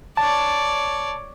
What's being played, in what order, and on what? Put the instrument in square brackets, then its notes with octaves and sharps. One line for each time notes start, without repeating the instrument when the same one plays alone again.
[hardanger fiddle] C#5 D5 [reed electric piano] A5